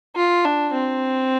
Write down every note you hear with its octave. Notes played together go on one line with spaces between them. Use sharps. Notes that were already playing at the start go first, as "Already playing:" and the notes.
F4
D4
C4